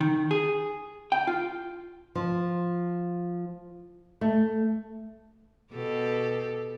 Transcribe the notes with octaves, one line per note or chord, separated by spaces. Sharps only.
D#3
G#4
G5
F4
F3
A3
B2 G4 A4